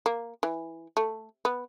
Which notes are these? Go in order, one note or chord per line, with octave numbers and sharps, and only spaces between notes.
A#3
E3
A3
B3